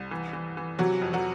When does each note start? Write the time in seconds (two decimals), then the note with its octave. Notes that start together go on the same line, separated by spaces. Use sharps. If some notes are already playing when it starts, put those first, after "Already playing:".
Already playing: C2
0.11 E3
0.33 E3
0.57 E3
0.79 C3 F#3 F#4
1.02 F2
1.13 F#3 F#4